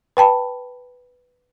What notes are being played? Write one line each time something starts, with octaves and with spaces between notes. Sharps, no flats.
B4 G5 A5 B5